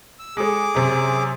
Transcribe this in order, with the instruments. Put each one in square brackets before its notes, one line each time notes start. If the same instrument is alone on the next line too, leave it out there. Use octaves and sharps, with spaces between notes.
[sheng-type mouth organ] E6
[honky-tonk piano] G#3 A4 [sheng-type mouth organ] G#4 D6
[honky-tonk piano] F#2 C3